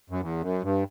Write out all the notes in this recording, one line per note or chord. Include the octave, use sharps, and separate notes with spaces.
F#2
E2
F#2
G2